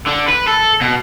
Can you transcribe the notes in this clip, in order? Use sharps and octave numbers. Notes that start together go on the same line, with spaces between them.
D3
B4
A4
B2